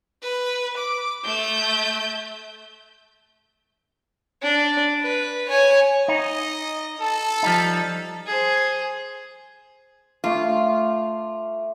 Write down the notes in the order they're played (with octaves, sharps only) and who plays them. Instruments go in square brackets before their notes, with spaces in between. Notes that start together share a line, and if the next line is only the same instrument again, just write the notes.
[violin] B4
D6
A3 G6
D4
B4
C#5 G#5
[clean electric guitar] D#4 [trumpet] D#5
[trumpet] A4 [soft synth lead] A5
[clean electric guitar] F3 G3 D#4
[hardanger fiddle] G#4 C5
[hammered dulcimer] A3 D6 [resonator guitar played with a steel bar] F4